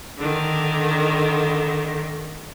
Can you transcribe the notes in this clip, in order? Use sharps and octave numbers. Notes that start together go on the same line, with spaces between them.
D3 D#3